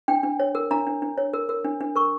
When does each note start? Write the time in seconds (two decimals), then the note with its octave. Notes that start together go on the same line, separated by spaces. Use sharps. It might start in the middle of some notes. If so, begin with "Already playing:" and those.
0.08 D4 G5
0.23 D4
0.40 C#5
0.55 A#4
0.71 D4 A#5
0.87 D4
1.02 D4
1.18 C#5
1.33 A#4
1.49 A#4
1.64 D4
1.81 D4
1.96 A#4 C#6